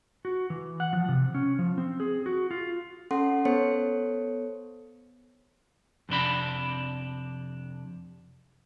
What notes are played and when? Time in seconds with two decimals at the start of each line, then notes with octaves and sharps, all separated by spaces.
0.25 F#4
0.50 E3
0.80 F#5
0.93 F3
1.09 C3
1.34 C#4
1.59 F3
1.78 C4
2.00 G#4
2.26 F#4
2.51 F4
3.11 C#4 A4 F#5 C6
3.45 B3 A4 C5 C#5 C#7
6.09 F2 C3 D4 B5